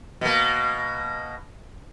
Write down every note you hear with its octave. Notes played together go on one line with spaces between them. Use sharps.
B2 A#3